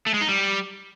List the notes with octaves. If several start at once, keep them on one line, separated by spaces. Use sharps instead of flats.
A3
G#3
D#4
G3